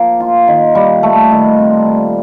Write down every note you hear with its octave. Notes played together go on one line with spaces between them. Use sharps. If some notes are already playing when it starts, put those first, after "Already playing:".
Already playing: F3 A#3
F4
D#3
G3
A3
D#3
C4
A#2